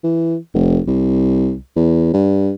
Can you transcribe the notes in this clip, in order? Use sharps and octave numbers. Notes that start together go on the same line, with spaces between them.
E3
F1
C2
E2
G2